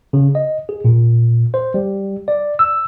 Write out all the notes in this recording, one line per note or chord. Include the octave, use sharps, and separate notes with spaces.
C#3
D#5
G#4
A#2
C5
G3
D5
E6